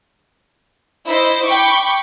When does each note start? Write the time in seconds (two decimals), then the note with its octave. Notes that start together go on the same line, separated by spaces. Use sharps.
1.05 E4 C5 D#5
1.44 G5 B5 C#6 D6